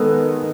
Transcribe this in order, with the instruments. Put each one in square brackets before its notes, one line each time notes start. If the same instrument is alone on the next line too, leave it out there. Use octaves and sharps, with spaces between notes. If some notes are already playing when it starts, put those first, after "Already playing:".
Already playing: [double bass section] D#3 G#3 B3 [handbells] A4 B4